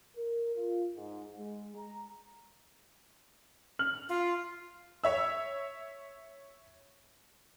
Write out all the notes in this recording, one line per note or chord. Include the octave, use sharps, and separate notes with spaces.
A#4
F4
G#2
G#3
A#5
F6 F#7
F4
C#5 E5 E6